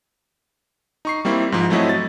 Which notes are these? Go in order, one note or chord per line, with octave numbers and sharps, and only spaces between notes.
D#4 C#6 C7
G3 A#3 C4 E4
G#2 F3
F#3 A3 C4 E4 C#5 D#5
A6